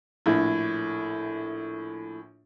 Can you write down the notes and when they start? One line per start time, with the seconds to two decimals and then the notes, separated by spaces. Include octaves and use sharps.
0.26 A#1 A2